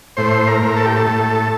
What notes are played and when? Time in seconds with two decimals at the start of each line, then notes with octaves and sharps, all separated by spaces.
0.17 A2 C5
0.47 A#4
0.63 A2
0.77 A4
0.86 G4
0.96 A4
1.06 A2